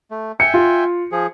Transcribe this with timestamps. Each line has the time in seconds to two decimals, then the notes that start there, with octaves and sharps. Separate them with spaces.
0.11 A3
0.40 E5 G5 G#5 C#7
0.54 F4
1.12 F3 G#4